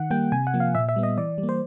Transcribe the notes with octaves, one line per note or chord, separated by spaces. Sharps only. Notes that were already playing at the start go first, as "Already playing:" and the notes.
Already playing: D#3 F#5
G3 A#3 G5
C3 G#5
F#5
F3 A#3
F5
A#2 E5
E5
G3 B3
D#5
E3 D5
G3
A#3
C5